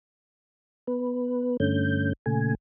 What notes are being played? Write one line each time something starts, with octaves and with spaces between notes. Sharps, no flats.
B3 B4
G2 D3 A3 C#4 G6
A#2 C#3 A3 G#5